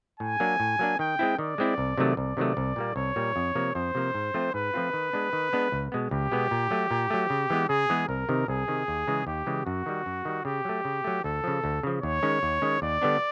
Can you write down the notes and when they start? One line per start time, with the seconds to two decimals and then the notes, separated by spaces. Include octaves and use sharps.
0.20 A2 G#5
0.40 F#3 A#3 D4
0.60 A2
0.79 F#3 A#3 D4
0.99 D#3 G5
1.19 G#3 C4 E4
1.38 D#3 D5
1.58 G#3 C4 E4
1.78 C2
1.98 C3 D#3 F#3 A3
2.17 C2 D5
2.37 C3 D#3 F#3 A3
2.57 C2
2.76 A#2 G3 A#3
2.96 C2 C#5
3.16 A#2 G3 A#3
3.36 F2
3.55 C3 F3 A#3
3.75 F2 C5
3.95 C3 F3 A#3
4.14 G#2
4.34 F3 A3 C4 F4
4.54 G#2 B4
4.74 F3 A3 C4 F4
4.93 D#3
5.13 G#3 B3 D4
5.33 D#3
5.53 G#3 B3 D4
5.72 C#2
5.92 B2 G#3 B3
6.11 C#2 G4
6.32 B2 G#3 B3
6.51 A#2
6.71 F#3 A3
6.91 A#2
7.10 F#3 A3
7.30 C#3
7.50 E3 G#3 B3
7.69 C#3 G#4
7.89 E3 G#3 B3
8.08 C2 A#4
8.29 C3 D#3
8.48 C2 G#4
8.68 C3 D#3
8.88 D#2
9.08 C#3 E3 G#3
9.27 D#2 G4
9.46 C#3 E3 G#3
9.66 F#2 F#4
9.86 D#3 G3
10.06 F#2
10.25 D#3 G3
10.45 C#3 G4
10.65 F#3 A3
10.85 C#3
11.04 F#3 A3
11.24 D2 A4
11.44 C#3 F3
11.64 D2
11.83 C#3 F3
12.02 D#2 C#5
12.23 D#3 G#3 C#4
12.43 D#2
12.62 D#3 G#3 C#4
12.82 D#2 D5
13.02 D3 G3 B3 D4